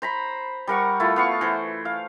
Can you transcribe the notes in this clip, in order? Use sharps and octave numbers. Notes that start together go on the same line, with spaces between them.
C5 A#5 B5
G3 A#4 F#5 C#6
A3 E4 F4
B3 F5 C#6
E3 C5
F5